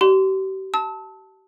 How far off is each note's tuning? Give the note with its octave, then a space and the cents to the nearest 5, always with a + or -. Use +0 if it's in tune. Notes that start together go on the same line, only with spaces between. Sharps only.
G4 -40 C6 -25
A5 +0 E6 -40